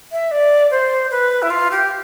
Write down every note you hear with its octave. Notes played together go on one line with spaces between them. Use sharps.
E5
D5
C5
B4
E4
F4
G4